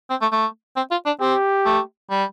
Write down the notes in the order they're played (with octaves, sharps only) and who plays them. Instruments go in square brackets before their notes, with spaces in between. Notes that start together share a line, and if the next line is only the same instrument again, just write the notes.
[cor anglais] C4
A3
A3
C4
F4
D4
[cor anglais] C4 [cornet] G4
[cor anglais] A3
G3